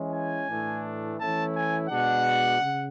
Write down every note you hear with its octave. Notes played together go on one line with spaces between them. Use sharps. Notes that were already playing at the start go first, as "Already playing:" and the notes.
Already playing: E3 G#3 C#4 E4
G#5
A2 E3 A3 D4
E3 A3 C#4 E4 A5
G#5
B2 G#3 D4 F#5
C#3